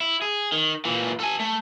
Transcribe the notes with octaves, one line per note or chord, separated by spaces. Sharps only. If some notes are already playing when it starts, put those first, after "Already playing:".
E4
G#4
D#3
A#2 E3
A4 G#5
A3